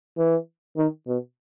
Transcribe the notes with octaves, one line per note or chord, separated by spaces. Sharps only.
E3
D#3
B2